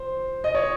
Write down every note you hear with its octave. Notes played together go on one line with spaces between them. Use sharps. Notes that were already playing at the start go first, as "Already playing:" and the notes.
Already playing: C5
D#5
C#5